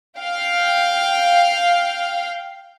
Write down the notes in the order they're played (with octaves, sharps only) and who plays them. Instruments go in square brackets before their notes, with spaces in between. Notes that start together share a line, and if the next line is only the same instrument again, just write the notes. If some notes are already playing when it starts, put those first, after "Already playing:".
[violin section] F5 G5